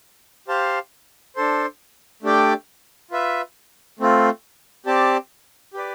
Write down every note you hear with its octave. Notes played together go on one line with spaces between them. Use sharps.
G4 C5 F5 A5
D4 A4 C5
A3 D4 G4 D5 G5
F4 B4 E5
A3 C4 F4
C4 G4 D5 A5
G4 B4 D5